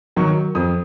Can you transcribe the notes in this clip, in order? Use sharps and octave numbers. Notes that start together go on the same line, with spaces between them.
D#3 F#3 C#6
F2 D#6